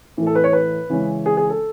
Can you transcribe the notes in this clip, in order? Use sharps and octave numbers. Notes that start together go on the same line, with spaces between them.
A2 E3 A3
A4
B4
C#5
B4
C#3 E3 G#3 C#4
G#4
G#4
A4